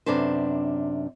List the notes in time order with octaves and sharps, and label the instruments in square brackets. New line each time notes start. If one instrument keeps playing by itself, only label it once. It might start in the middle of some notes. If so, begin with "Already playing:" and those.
[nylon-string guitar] F#2 C3 D4 B4 C5